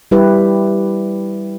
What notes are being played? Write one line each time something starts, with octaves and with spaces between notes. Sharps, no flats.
G3 E4 G4 B4